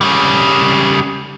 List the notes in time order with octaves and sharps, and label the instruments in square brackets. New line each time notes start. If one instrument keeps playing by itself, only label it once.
[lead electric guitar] C#3 G3